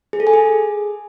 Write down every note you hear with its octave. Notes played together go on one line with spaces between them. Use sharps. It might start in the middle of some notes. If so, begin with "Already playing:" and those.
G#4
A4
G#5
G#4